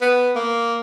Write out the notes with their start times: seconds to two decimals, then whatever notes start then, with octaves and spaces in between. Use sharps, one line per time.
0.01 B3
0.36 A#3